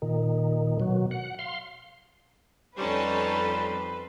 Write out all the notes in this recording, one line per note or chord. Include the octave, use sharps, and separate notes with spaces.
A#2 D#3
B2 F#3
F#5
F5 C6
F2 G3 C#4 D#4 A4 B4 C5 A5